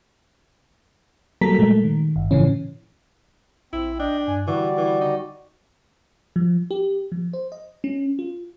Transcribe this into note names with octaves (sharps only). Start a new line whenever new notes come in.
F#3 G3 A#3 A4 A#5 B6
A#2 G#3 A3
D#3
G1
A2 C#3 E3 F3 C#4
A#1 C4 E4
D4 D#5 G5
G2 G#5
D3 E3 G3 F#4 D5
E3
D#4
F3
G4
F3
C5
D#5
C#4
F4